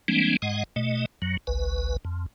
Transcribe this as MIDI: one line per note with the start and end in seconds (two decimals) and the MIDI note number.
0.08 0.37 52
0.08 0.37 55
0.08 0.37 56
0.08 0.37 58
0.08 0.37 60
0.08 0.37 62
0.42 0.64 44
0.42 0.64 56
0.42 0.64 75
0.42 0.64 78
0.76 1.06 47
0.76 1.06 57
0.76 1.06 75
1.22 1.37 42
1.22 1.37 54
1.47 1.97 32
1.47 1.97 37
1.47 1.97 71
2.05 2.26 41